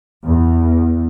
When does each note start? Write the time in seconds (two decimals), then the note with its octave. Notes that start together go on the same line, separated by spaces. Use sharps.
0.25 E2